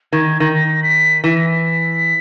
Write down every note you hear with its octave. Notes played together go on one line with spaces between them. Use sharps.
D#3 G#6
D#3 A#6
B6
E3 B6
A#6
B6